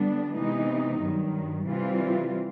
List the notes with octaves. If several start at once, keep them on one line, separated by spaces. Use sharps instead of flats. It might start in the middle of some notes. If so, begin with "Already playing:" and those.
Already playing: D3 G3 B3 D4
C3 E3 G#3 B3 D#4
G2 D#3 F#3
C3 E3 G3 C4 F4